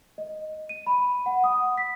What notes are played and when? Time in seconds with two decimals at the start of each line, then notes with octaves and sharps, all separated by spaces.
0.18 D#5
0.69 D#7
0.87 B5
1.26 F#5
1.44 D#6
1.78 B6